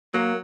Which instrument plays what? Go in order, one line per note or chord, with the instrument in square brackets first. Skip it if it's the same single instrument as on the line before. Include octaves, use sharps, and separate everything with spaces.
[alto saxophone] F#3 [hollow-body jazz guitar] A#3